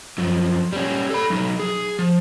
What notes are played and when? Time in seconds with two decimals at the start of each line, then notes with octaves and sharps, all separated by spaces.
0.18 F#2 F3
0.73 G3 C#4
1.10 A4 B5
1.30 F#3 D#4
1.59 G#4
1.99 F3